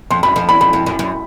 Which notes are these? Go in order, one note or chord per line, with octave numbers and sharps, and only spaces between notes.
F2 C6
F#2 B5
F2
E2 B5
F2 B5
F2
F#2
F#2